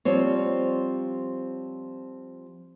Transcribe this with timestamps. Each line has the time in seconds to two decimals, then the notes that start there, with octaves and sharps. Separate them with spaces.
0.05 F3 G3 C4 C#5